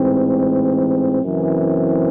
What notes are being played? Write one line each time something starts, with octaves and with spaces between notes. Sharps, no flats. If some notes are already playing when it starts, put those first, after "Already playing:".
Already playing: A1 G#2 E3 C4
F#1 F#2 E3 C4